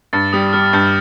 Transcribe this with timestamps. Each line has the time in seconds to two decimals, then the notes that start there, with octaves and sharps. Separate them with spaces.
0.13 G2 A6
0.33 G3 D#6
0.53 G3 F6
0.73 G2 G6